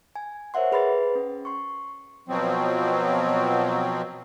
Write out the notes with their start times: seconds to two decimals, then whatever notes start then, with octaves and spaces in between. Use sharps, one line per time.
0.16 G#5
0.54 A#4 C5 C#5 E5 F#5 C6
0.72 G#4 B4 B5 C6 A6
1.15 C#4
1.45 C6 C#6
2.28 B2 F3 F#3 C4